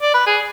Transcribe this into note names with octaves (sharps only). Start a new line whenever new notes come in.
D5
B4
G#4